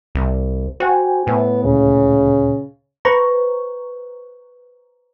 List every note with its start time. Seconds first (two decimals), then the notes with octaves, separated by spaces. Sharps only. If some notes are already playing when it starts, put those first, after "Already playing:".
0.15 C2
0.80 F#4 C5 G5 G#5
1.27 A2 B3
1.64 D2 A#2 C#3
3.05 B4 C5 A#5 C#6